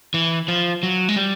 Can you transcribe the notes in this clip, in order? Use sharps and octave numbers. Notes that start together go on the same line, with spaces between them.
E3
F3
F#3
G#3
G3